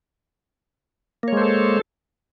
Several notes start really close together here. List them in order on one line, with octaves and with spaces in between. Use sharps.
A#3 C#5 G#3 C5 A4